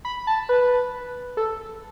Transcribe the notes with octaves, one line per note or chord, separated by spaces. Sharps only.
B5
A5
B4
A4